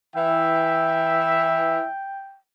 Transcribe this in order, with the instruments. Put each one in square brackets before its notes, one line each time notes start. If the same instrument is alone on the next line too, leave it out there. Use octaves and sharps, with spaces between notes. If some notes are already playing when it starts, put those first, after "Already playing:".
[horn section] E3 E5 [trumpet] G5